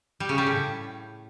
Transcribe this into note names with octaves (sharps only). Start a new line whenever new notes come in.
G3
C#3
G3
A2